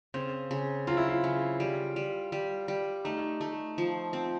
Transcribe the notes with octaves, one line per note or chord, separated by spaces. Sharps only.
C#3 C4
C#3
F#3 F4
E4
F4
C#3
G3
G3
G3
G3
A3 D#4
A3
F3
C4